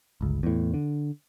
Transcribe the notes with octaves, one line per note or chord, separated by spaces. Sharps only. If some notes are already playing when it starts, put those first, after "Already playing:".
G1 C#2
E2 A2
D3